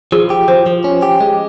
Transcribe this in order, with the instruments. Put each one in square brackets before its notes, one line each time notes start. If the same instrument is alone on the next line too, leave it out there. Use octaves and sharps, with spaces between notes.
[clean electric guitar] F3 [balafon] G#4
[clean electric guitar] G4
[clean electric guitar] F3 [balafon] C5
[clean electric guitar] F3
C#4
G4
G#3